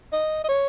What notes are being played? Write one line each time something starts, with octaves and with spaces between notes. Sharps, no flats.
D#5
D#5
C#5